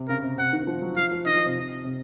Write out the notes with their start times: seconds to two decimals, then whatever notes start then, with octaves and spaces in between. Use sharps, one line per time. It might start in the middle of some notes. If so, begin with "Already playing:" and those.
Already playing: C3
0.08 C#3 A#4
0.23 C3
0.37 C3 F#5
0.53 D#3
0.63 D#3
0.67 F3
0.82 F#3
0.97 F3 F5
1.11 F3
1.26 D#3 D#5
1.36 F3
1.46 C3
1.84 C3